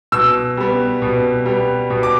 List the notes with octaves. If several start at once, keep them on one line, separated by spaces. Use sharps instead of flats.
B2 E6
G3 B3
B2
G3 B3
B2
D6